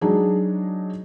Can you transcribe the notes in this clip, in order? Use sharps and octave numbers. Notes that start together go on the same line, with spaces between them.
F#3 G#3 D4 D#4 G#4